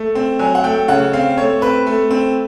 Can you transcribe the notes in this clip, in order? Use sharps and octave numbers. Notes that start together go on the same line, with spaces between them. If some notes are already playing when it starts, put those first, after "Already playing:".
Already playing: A3
C4
F#3 G#5
F#5
A3 G5
C#3 F#5
C4 F5
A3 C#5
C4 B4
A3
C4